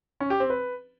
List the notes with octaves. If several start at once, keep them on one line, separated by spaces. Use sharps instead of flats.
C#4
G4
C4
B4